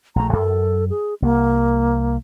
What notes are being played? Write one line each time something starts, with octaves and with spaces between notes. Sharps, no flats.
A#1 A3 A#5
F#2 A4
G#4
C2 A#3